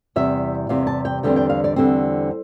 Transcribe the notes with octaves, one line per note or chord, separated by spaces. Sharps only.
E2 C3 G3 E5
E2 C3 G3 F5
A5
G5
E2 D3 G3 C4 G5
G5
F5
D5
E2 D3 G3 C4 C5